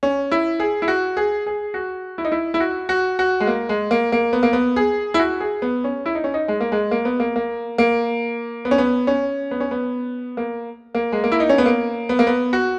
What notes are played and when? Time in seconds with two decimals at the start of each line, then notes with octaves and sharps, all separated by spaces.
0.03 C#4
0.31 E4
0.60 G#4
0.82 E4
0.88 F#4
1.17 G#4
1.46 G#4
1.74 F#4
2.18 E4
2.25 D#4
2.32 E4
2.54 E4
2.60 F#4
2.89 F#4
3.19 F#4
3.40 G#3
3.47 A#3
3.69 G#3
3.91 A#3
4.12 A#3
4.33 B3
4.43 A#3
4.53 B3
4.76 G#4
5.14 E4
5.19 F#4
5.40 G#4
5.62 B3
5.84 C#4
6.06 E4
6.15 D#4
6.24 C#4
6.34 D#4
6.48 G#3
6.60 A#3
6.72 G#3
6.91 A#3
7.05 B3
7.20 A#3
7.36 A#3
7.78 A#3
8.65 B3
8.71 C#4
8.78 B3
9.07 C#4
9.51 B3
9.60 C#4
9.71 B3
10.37 A#3
10.94 A#3
11.12 G#3
11.24 A#3
11.32 E4
11.40 D#4
11.49 C#4
11.58 B3
11.66 A#3
12.09 B3
12.19 A#3
12.27 B3
12.53 F#4